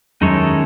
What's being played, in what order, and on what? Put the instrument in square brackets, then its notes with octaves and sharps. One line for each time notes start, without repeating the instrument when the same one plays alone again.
[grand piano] F#2 [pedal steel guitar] D#3 G#3 D#4 A4 C#5